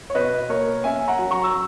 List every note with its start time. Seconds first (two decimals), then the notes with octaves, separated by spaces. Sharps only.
0.10 C#5
0.15 B2 B4 D#5
0.49 A#3 A#4 C#5
0.84 C#4 E5 G#5
1.08 F#5 A#5
1.19 F#3
1.31 A#5 C#6
1.44 E6